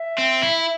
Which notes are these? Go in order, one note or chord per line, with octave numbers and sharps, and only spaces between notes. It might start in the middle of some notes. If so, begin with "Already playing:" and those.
Already playing: E5
C4
E4